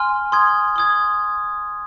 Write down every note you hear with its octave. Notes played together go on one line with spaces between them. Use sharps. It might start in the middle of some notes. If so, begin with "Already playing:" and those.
Already playing: G#5 C6 F6
C6 D#6 G#6
C6 D#6 G#6